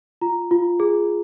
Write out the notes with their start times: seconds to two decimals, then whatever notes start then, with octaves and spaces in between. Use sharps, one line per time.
0.21 F4 A#5
0.51 F4
0.80 G#4